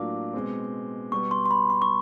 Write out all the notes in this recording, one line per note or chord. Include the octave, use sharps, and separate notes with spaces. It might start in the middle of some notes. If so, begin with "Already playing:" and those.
Already playing: A2 F#3 A#3 D4 F4 D6
B2 G#3 C4
B2 G3 B3 C#6
C6
C6
B5
C6
C#6